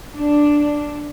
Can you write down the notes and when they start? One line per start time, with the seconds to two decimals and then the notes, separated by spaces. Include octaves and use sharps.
0.14 D4